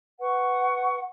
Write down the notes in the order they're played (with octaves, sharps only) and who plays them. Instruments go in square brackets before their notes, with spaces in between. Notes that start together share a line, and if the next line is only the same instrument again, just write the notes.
[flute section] B4 F#5 C#6